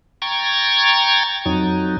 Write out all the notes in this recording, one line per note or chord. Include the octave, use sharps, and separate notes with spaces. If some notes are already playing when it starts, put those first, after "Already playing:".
G5 A#5 C#6 G#6 A6
F2 F#3 D#4